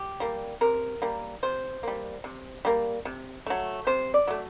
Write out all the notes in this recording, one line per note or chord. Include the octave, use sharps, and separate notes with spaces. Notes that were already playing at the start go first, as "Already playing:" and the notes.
Already playing: G4
G3 A#3
C3 A#4
G3 A#3
C3 C5
G3 A#3
C3
G3 A#3
C3
F#3 A3
C3 C5
D5
F#3 A3